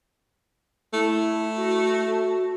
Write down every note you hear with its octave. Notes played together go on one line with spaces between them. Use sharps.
A3 E4
F#4